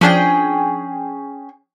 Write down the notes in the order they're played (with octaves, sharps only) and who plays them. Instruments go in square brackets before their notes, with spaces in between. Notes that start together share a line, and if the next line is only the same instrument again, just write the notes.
[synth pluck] F3 D4 [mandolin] C#4 G#4 G5